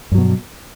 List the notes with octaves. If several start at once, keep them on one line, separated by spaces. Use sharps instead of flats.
G2 B2 F#3